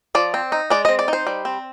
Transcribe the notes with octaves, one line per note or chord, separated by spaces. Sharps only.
F3 D5
C4
D#4
G#3 D5
C4 D#5
D5
D#4 C5
G3
C4